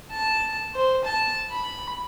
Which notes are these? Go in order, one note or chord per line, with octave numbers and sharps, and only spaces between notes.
A5
C5
A5
B5